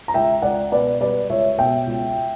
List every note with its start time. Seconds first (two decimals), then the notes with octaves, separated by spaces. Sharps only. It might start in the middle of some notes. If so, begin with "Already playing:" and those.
0.08 A#5
0.14 C#2 E5 G5
0.42 C#2 D5 F#5
0.72 B2 B4 D5
1.01 G3 B4 D5
1.30 C#2 C#5 E5
1.58 B2 E5 G5
1.87 C#2